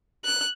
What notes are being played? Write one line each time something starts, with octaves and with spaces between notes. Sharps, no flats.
F#6